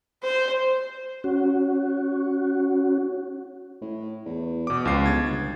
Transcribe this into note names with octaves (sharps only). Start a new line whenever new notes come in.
C5
C#4 F#4
A2
E2
B2 D6
C#2 F3 C7
G1 G#6 A6